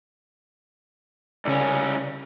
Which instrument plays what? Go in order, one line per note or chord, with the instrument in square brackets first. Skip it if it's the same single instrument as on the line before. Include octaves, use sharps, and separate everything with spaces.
[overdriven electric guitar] C2 C#4 [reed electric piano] C#3 D5